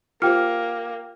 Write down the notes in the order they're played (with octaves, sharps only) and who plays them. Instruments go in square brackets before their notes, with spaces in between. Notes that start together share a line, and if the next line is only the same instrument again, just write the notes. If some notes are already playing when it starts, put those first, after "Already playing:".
[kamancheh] A#3 [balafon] F4 G4 C5 [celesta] G5 F6